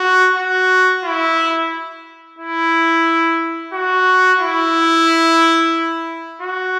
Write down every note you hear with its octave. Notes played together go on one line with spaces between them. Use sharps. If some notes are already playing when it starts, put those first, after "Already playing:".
Already playing: F#4
F#4
E4
E4
F#4
E4
F#4